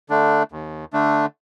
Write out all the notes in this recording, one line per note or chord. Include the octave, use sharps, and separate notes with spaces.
D3 A3 D4
D#2
D3 A3 D4